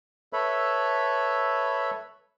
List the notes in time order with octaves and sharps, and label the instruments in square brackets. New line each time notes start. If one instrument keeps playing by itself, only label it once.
[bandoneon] A4 B4 C#5 E5 B5